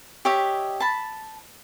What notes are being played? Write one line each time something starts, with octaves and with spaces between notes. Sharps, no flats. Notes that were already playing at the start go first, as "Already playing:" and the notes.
G4 C#5 D#5 E5
A5 B5